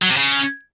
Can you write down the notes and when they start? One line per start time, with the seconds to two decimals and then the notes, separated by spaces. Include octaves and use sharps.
0.03 F#3
0.10 C3
0.17 C#3